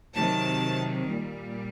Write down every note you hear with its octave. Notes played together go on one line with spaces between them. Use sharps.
C3 D#3 F#3 A5
A#2 G3